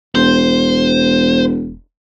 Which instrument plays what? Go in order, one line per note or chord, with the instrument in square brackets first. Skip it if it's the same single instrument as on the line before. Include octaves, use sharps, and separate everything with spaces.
[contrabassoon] E1 [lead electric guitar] C5